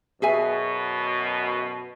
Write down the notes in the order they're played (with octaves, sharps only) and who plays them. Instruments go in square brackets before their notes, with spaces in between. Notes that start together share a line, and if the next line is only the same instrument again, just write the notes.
[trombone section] F#2 B2 [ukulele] G#4 E5 G#5